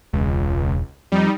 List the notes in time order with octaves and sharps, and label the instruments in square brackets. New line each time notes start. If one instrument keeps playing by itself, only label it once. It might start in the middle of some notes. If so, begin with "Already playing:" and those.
[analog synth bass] E1 [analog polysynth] C#2
[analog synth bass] F2 [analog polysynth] G3 D#4